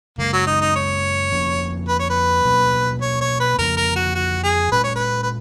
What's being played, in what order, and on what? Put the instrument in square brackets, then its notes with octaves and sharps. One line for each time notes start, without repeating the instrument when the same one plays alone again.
[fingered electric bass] F#2 C#3 G#3 [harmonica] A#3
[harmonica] F#3
D#4
D#4
C#5
[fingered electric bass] F2 F3 A#3 C#4
[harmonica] B4
C#5
B4
[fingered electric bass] B2 F#3 A#3 C#4
[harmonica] C#5
C#5
B4
[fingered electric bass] F2 C#3 F3 A#3 [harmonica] A#4
[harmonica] A#4
F#4
F#4
G#4
[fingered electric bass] A#2 G#3 C#4 [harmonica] B4
[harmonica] C#5
B4
B4